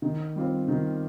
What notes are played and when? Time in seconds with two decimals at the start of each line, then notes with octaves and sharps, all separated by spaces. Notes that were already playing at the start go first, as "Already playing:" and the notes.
0.02 D#3
0.36 G3 C4 F4
0.68 D#3